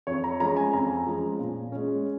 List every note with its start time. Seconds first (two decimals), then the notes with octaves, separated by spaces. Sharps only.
0.07 F2 C#5
0.24 A#5
0.40 F3 G#3 C#4 A#5
0.56 G#5
0.73 F2 A#5
1.07 F3 G#3 C#4
1.39 A#2
1.72 G#3 C#4